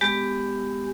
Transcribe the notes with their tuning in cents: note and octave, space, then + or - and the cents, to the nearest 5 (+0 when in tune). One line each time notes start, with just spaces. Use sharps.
G#3 -5 B3 +20 G4 +0